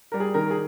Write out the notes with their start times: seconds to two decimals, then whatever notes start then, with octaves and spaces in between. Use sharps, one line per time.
0.12 G3 A#4
0.20 G#4
0.34 D#3 A#4
0.50 G#4